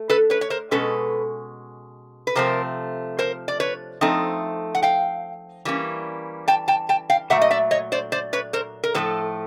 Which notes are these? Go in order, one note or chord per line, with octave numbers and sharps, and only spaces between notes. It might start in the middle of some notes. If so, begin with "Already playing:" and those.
Already playing: A3
A4 B4
B4 C#5
C#5
A#4 C5
B2 G#3 C#4 A4 B4
B4
C3 F3 A3 C4 A#4 C5
A#4 C5
D5
B4 C#5
F3 A3 C4 D#4
F#5
F5 G5
E3 G3 A#3 C#4
G5 A5
G5 A5
G5 A5
F5 G5
A#2 F#3 A3 E5 F#5
D#5
D5 E5
C#5 D#5
C5 D5
C5 D5
B4 C#5
A#4 C5
A#4
A2 F3 A3 A4 B4